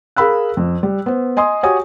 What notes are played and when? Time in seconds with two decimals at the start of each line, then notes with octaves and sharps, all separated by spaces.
0.16 G#4 A#4 F5 B5 E6 F#6
0.57 F2
0.83 G3
1.06 B3 C5
1.37 D#5 G#5 C6 D#6
1.63 F#4 G4 C#5 G#5 D#6